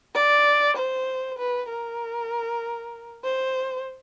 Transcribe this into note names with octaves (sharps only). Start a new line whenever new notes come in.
D5
C5
B4
A#4
C5